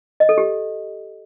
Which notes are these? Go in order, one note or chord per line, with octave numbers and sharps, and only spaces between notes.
D#5
A4
G4